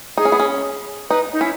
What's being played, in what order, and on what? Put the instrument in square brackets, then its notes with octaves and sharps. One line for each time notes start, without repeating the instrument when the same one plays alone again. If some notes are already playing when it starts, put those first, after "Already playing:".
[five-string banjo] D#4 [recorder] G#4
[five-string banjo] C#4
B3
C#4
[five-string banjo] D#4 [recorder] B4
[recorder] D#4
[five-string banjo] C#4 [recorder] E4